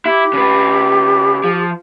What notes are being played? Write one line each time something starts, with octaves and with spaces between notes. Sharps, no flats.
E4 G4
C#3 B4
F3